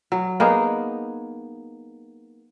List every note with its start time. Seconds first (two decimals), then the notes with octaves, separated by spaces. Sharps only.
0.12 F#3
0.40 A#3 B3 D#4 G#4